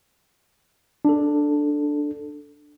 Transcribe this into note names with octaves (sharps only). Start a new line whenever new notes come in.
D4 A4